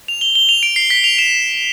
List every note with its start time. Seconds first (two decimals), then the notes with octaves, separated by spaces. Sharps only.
0.08 F7
0.21 G7
0.35 G7
0.49 F7
0.63 D7
0.76 C7
0.90 B6
1.04 F7
1.18 E7